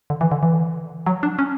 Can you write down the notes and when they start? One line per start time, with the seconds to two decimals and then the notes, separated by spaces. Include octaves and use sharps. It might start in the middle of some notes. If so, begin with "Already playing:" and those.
0.10 D3
0.21 E3
0.32 D3
0.43 E3
1.06 F#3
1.23 D4
1.39 C#4